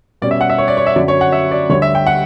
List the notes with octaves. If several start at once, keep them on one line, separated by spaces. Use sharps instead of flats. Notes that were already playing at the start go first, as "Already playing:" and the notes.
B2 G3 C#4 D5
E5
F#5
E5
C#5
D5
C#5
E5
F#2 D3 F#3 D5
C#5
F#5
E5
D5
D2 D3 G3 C#5
E5
G5
F#5